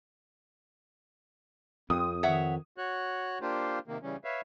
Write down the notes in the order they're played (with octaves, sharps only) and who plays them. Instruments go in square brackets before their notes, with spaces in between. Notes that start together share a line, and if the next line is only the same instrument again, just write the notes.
[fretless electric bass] F2 [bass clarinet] C4 [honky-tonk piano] D#6
[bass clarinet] D#3 [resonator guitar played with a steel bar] C#5 E5 F#5
[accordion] F#4 C#5 F#6
A#3 D4 F4 G4 C5
C3 D#3 A#3
C#3 E3 G3 C#4
B4 C#5 E5 F5